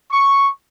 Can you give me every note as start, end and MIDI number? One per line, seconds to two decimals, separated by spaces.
0.11 0.49 85